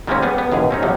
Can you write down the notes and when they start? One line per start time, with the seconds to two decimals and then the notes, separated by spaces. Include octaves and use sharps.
0.07 D#3 G3 G#3 A#3 C4 C#4
0.23 G3 B3 G#4
0.38 B3
0.52 A1 D#2 B2 G#4
0.70 C4 C#4 D#4
0.82 G1 E2 C3 F3 F#3